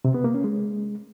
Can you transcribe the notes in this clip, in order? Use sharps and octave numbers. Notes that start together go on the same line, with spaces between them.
C3
B3
A#3
C#4
G#3